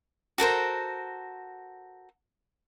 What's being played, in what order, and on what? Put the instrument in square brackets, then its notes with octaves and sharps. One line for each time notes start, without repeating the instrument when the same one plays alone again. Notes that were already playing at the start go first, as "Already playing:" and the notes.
[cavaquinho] F#4 A4 A#4 C5